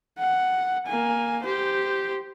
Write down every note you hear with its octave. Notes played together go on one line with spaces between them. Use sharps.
F#5
A#3 G#5
G4 C5